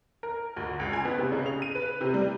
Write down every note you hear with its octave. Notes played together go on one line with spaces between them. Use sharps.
A#4
D2
C#2
G#5
B3
C3
C#3
F7
D#7
B4
C3
G3